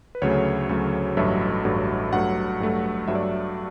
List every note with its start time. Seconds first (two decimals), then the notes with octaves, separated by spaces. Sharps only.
0.15 B4
0.22 D2 C#3 F#3 A3 C#5
0.69 D2 C#3 F#3 A3
1.17 A1 G2 F#3 A3 E5
1.65 A1 G2 F#3 A3
2.13 G2 F#3 A3 F#5
2.60 G2 F#3 A3
3.08 G2 F#3 A3 E5
3.15 D5
3.23 E5